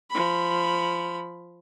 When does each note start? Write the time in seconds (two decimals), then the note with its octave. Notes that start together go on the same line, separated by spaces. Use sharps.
0.11 F3 B5